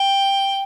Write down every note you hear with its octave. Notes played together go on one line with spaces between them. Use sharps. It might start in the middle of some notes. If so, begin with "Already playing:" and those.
Already playing: G5